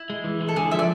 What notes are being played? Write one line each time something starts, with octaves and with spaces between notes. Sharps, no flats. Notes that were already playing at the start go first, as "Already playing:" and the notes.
Already playing: E4
G#3
E3
G#3
A4
D3 G#4
F3 E5
D5